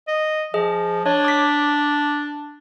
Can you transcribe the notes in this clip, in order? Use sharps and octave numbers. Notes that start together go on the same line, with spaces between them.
D#5
F3 G#4 D#5
D4 C#5 D#5
D6 B6